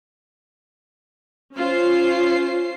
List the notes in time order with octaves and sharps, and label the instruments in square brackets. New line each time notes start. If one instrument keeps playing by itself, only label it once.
[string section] C#4 F4 C5 C7